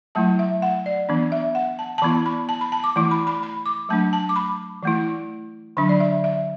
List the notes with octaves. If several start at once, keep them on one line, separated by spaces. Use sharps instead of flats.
F#3 A3 E4 A5
E5
F#5
D5
E3 B3 D4
E5
F#5
A5
A5
E3 B3 E4 B5
B5
A5
B5
A5
D6
E3 A3 E4 D6
B5
B5
B5
D6
F#3 A3 D4 A5
A5
D6
B5
E3 A3 E4
D3 F#3 D4 B5
D5
E5
E5